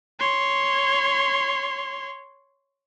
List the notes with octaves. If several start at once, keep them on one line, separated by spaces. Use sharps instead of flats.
C#5 C6